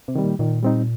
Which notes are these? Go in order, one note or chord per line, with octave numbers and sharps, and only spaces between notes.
C3
D#3 G3
A#2
A#2 D#3
G3 C4 D#4